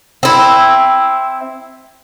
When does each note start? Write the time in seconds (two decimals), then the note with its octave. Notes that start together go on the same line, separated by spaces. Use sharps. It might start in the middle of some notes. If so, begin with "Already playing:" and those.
0.23 C4 E4